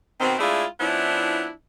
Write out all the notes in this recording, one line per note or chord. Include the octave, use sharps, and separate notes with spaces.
B2 D#3 B3 C4
G#3 A3 D4 E4 F4 G#4
F3 B3 C#4 D4 E4